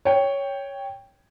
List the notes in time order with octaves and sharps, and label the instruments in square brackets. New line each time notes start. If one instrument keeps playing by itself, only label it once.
[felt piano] C#5 G5